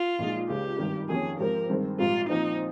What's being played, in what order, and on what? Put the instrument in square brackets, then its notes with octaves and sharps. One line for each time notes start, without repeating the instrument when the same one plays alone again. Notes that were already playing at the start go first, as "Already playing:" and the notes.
Already playing: [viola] F4
[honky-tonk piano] A#1 A#2 G#3 D#4
[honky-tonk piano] C#2 C#3 G#3 [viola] G4
[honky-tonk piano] G#1 G2 D#3 G3
[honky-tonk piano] F2 D#3 A#3 C#4 G4 [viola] G#4
[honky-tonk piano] G#2 F3 C4 G4 [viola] A#4
[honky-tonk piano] G2 D#3 G#3 C4
[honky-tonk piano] A#1 G#2 G3 [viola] F4
[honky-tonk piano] A#2 F3 C4 [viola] D#4